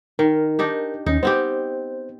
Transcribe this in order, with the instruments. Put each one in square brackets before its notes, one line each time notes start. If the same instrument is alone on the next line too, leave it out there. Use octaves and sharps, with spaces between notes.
[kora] D#3 [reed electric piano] A#4
[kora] D4 D#4 G4
[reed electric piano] D#2 C#4 [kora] D#4
[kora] B3 C4 G4 [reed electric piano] C5